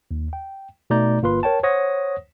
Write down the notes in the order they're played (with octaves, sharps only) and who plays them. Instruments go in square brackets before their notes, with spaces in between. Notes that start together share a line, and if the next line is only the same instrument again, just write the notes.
[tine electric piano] D#2
G5
B2 A3 D#4 D5 A#5 G6
G1 A#3 F4 B4 C6
A#4 C#5 G5 A5
C5 C#5 F#5 D#6 A#6